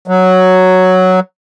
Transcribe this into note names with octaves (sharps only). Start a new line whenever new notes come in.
F#3